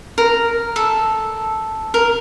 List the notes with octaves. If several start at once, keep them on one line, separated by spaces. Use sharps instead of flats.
A#4
A4
A#4